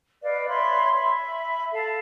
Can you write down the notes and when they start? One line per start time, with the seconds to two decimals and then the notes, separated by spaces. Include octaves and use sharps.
0.23 B4 D5 D#5 F5
0.48 C#5 E5 B5 C6
0.94 E5 B5
1.73 A4 F5 A5